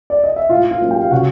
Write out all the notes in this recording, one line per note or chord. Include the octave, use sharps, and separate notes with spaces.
D5
D#5
E5
A2 F4 F5
F4 F5
F#3 A#3 C#4
G4 G5
F5
C#3 F#4 F#5